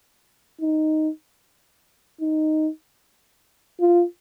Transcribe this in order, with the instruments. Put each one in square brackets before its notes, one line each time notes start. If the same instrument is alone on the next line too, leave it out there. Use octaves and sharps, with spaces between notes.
[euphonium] D#4
D#4
F4